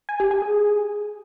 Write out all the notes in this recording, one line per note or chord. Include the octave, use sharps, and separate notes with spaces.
G#5
G4
G#5
G#4